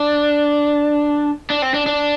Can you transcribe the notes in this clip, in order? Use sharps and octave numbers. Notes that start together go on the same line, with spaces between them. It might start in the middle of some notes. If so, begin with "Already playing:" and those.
Already playing: D4
D4
C4
D4
D4